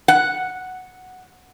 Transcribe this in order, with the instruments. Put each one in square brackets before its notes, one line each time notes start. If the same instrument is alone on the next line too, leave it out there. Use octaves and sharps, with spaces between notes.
[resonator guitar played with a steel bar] F#5